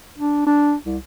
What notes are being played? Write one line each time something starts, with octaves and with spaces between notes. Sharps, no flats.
D4
D4
C2